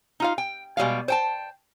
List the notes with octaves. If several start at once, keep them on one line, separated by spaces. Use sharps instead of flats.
D#4 F4 F5
G5
B2 G3 G#3 F5
C5 G5 A5